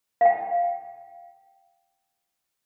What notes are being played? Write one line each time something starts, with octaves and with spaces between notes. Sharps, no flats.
F5 G5